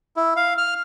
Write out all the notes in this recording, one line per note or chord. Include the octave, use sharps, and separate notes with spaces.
E4
F5
F6